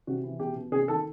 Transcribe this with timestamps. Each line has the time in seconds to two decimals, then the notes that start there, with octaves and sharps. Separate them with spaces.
0.07 C3 F#4
0.23 E3
0.40 B2 G4
0.56 B2
0.72 C3 G#4
0.88 D#3 A4